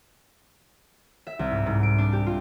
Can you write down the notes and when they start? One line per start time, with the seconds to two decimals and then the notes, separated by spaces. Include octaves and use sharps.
1.27 E5
1.39 C2
1.51 G#2
1.66 G#2
1.83 D7
1.98 D4
2.13 G4
2.26 F4